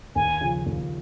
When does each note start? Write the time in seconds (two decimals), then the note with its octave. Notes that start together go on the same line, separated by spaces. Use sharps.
0.15 D#2 G#5
0.41 C#3 F3
0.66 D#2